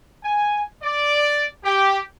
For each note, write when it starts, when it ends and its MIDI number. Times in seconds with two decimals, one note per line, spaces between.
0.24 0.62 80
0.83 1.46 74
1.64 2.01 67